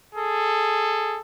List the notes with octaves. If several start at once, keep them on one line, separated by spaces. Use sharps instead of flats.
G#4 A4